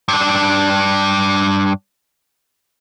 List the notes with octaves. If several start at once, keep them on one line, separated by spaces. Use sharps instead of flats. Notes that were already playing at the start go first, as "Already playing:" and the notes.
G2 D4